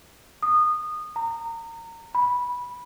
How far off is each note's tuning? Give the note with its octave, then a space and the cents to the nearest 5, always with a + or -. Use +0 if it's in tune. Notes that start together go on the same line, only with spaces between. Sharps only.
D#6 -20
A#5 -25
B5 -10